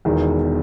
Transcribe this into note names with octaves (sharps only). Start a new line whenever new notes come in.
E1 E2 D#3